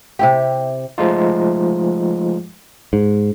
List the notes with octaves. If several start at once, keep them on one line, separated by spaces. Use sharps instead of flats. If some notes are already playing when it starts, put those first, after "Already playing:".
C3 E4 G4
F3 G#3 A3 D#4 F4
G#2